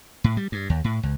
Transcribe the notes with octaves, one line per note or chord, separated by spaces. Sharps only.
A2
G3
G2
D#2
A2
C#2